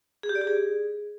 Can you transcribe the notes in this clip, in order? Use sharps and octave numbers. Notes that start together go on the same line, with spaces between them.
G#4
G4
D5
G4
G#4